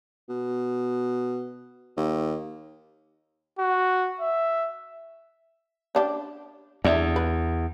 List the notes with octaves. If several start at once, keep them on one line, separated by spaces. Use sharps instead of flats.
B2
D#2
F#4
E5
C#4 D4 G4
E2 D3 E5
B4